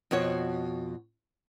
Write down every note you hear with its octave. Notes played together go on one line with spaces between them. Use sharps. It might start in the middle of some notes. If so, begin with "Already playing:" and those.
F2 B2 F#4 C#5